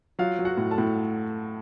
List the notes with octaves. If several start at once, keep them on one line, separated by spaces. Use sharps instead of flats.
F#3 F4 F5
F#3
F#4 F#5
A2
A4 A5
A2